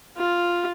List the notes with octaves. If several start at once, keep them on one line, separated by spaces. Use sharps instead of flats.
F4